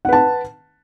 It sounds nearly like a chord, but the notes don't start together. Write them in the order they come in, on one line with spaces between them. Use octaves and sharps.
F#5 B4 A5